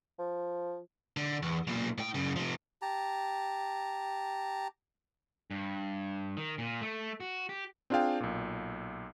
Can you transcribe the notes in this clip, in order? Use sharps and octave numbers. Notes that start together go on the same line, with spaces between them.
F3
D3
E2
B1 A#2
A2 G5
F#2 C#3
C3 F3
G4 A5 A#5
G2
D#3
A#2
A3
F#4
G4
C4 D4 F4 G#4 F5 G5
B1 A#2